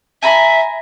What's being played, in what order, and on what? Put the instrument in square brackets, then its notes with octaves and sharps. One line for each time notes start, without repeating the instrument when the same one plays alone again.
[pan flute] E5 [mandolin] G#5 A#5 B5